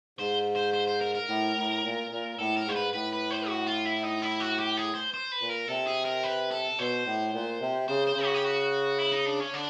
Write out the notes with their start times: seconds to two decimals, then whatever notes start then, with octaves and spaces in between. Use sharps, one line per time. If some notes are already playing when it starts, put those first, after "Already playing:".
0.19 G#2 C5
0.55 C5
0.73 C5
0.87 C5
1.01 A#4
1.15 A#4
1.28 A2
1.57 A2
1.84 A#2
2.11 A#2
2.39 A2 A4
2.57 A#4
2.66 G#2 C5
2.76 B4
2.93 A2 B4
3.13 B4
3.30 C5
3.48 F#4
3.67 F4
3.86 E4
4.04 D#4
4.22 E4
4.40 F#4
4.59 G4
4.77 G#4
4.95 C5
5.14 C5
5.32 B4
5.41 A#2
5.50 A#4
5.68 C3 A4
5.87 G#4
6.05 A#4
6.24 B4
6.51 A4
6.78 B2 C5
7.06 A2
7.33 A#2
7.61 C3
7.88 C#3 C5
8.07 C5
8.16 C#3
8.25 F#4
8.34 G4
8.44 F#4
8.99 E4
9.12 D#4
9.26 D4
9.40 C#4
9.53 D3 D4